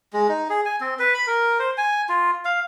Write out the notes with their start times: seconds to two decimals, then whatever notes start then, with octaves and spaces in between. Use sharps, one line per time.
0.13 G#3
0.29 D#4
0.49 G#4
0.65 G#5
0.81 C4
0.99 B4
1.14 B5
1.27 A#4
1.59 C5
1.78 G#5
2.09 F4
2.45 F5